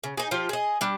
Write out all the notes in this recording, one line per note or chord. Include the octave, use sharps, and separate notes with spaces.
C#3
D#4 G#4
F3 F4 G4
G#4 D#5
G3 D4